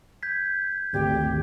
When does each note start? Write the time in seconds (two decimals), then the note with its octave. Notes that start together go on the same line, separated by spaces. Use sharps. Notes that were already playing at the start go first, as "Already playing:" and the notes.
0.23 G6 G#6 B6
0.93 G#1 D2 G4